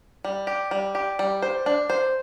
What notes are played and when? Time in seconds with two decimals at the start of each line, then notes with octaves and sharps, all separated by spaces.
0.24 G3
0.47 G4
0.71 G3
0.95 G4
1.19 G3
1.42 C5
1.66 D4
1.90 C5